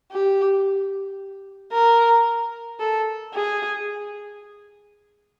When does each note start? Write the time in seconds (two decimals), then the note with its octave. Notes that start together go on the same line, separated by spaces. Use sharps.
0.11 G4
1.73 A#4
2.80 A4
3.34 G#4